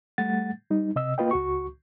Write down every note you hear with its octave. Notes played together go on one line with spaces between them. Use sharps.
G3 A3 F#5 A6
G3 D#4
C3 D#5 E6
A#3 F4 B4 D#5 G5
C#2 F#4 C#6